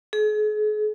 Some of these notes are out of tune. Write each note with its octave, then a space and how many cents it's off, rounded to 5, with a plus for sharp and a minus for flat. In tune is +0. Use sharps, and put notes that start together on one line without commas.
G#4 +40